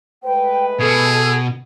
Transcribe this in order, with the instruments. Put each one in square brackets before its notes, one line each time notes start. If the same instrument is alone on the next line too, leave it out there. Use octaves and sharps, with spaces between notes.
[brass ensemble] G#3 A3 B4 [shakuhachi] G5
[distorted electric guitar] B2 [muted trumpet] G#4 [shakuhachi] A4